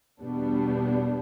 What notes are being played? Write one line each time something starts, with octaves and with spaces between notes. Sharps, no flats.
E2 B2 G3 B3 D4